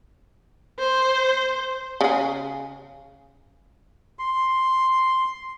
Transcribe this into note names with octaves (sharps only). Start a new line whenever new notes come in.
C5
C#3 G#4
C6